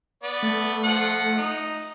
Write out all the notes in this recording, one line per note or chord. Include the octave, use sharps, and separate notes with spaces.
B3 D5
A3
F3 F#5
D#4